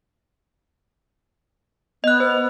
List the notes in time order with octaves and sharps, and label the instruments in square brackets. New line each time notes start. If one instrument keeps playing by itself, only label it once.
[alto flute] B3 [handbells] D#5 F#6
[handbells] C5